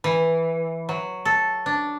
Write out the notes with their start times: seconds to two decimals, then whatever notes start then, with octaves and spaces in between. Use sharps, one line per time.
0.04 E3
0.89 F#3
1.25 A4
1.66 D4